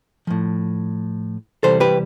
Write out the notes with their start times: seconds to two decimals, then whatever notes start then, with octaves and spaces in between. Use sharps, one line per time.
0.27 A2 F3
1.63 C3 E3 G3 A4 C5
1.80 G4 B4